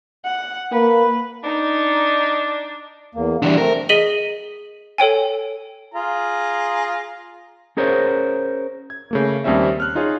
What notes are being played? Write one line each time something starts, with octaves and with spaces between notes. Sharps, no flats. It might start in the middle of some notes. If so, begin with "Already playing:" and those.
F#5
A#3 B4
D4 D#4
E2 A#3
E3 G3 D4
A3 C4 A#4
G#4 D#5 B6 D#7 F#7 G7
A4 C#5 G5 G#5
F4 G#4 A#5
C#4 G#4 A#4 C5 C#5
G#6
C#3 A3 A#3
D#2 G3 C4 C#4 E5
F6 F#6
D#4 F4 G#4 C#5